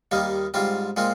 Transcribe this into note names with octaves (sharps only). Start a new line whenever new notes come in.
D#2 D#3 G3 A#3 D#4
G#2 G3 C4 F4
A#2 G#3 C4 F4